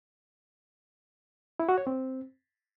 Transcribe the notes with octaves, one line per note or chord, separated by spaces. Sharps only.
E4
F#4
C#5
C4